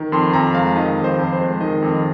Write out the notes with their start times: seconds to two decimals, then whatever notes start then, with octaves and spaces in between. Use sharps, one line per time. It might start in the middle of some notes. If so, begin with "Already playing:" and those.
Already playing: D#3
0.12 F2 C6
0.33 F2 A#5
0.54 G#3 F5
0.76 D#3 D#5
0.98 F2
1.04 C5
1.18 F2
1.33 C5
1.41 G#3
1.61 D#3 D#5
1.82 F2